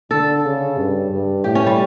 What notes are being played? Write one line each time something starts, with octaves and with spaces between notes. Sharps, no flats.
D3 A4
C#3
G2
G2
A2 G4
C#4
G3